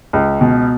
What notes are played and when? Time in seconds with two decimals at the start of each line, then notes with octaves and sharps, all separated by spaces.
0.13 C#2
0.41 B2